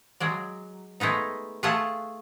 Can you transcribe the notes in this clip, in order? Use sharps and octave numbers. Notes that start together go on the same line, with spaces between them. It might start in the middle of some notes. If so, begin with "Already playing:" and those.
F#3 G#3 D5
G#3 A3 B3 D#4
A3 F4 G#4 F#5 G#5 A5